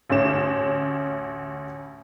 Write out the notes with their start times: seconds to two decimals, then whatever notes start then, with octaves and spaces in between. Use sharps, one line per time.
0.10 A1 D2 C#4 E7